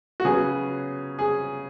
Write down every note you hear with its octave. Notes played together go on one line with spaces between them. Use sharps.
F#4
C#3 F#3 B3 G#4
G#4